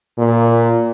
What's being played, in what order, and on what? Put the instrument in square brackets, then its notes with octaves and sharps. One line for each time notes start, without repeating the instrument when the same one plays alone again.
[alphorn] A#2